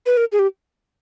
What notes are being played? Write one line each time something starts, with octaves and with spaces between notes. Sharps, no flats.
B4
A#4
G#4
G4